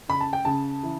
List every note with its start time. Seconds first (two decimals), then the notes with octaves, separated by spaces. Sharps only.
0.09 C#3 B5
0.21 A5
0.33 G5
0.45 C#3 A5
0.83 E3